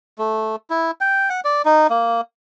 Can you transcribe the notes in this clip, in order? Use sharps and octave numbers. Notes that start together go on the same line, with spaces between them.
A3
E4
G5
F#5
D5
D#4
A#3